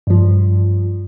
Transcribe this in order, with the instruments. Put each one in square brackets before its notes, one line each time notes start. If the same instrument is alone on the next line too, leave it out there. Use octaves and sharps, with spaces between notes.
[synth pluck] G2 F3